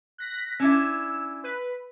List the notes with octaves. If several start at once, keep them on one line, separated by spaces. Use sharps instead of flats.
F#6 A#6 B6
C#4 D4 E4 E6
B4